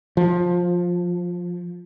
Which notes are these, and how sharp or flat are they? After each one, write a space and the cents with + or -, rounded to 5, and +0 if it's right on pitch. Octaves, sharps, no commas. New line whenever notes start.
F3 +15